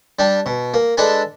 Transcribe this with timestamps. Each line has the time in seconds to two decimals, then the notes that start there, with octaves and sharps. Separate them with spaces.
0.19 G3 D4
0.46 B2
0.74 A#3
0.97 G#3 D4 A4 B4 G#5